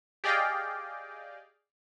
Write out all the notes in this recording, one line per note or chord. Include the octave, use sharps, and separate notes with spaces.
G4 G#4 D5 D#5 F5 G5